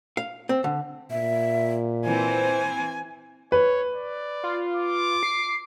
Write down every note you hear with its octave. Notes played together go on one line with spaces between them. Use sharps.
F5
C4
D3
A#2 E5
E3 C4 C5 G#5
B4 C#5
D5
F4
D6
C7